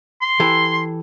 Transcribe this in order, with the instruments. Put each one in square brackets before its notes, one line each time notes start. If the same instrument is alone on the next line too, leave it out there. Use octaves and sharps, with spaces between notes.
[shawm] C6
[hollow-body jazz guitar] E3 G4 A4